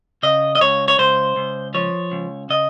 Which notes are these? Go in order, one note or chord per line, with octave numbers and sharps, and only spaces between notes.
C#3 D#5
D#5
C#2 C#5
C#5
C#2 C5
C#2
F3 C#5
C#2
C#3 D#5